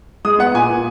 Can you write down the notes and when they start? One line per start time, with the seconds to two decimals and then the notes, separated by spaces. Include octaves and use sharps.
0.25 G#3 D#6
0.39 B3 F#5
0.54 A#2 G#5
0.70 A#2